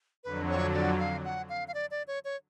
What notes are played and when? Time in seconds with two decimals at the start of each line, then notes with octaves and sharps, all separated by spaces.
0.24 F2 D3 F#3 B4
0.49 C#5
0.74 D5
0.99 F5
1.24 F#5
1.49 F5
1.68 F5
1.74 D5
1.91 D5
2.07 C#5
2.24 C#5